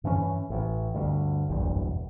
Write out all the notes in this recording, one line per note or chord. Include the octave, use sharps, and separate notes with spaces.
G2 E3 C4 C#4
A1
D2 G2
F#1 B1 E2 G2